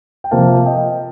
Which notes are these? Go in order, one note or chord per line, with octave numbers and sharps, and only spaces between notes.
G5
C3 F3 A#3 F4 F5 A5
D#5 G5